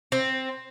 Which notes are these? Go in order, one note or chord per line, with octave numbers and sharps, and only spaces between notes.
C4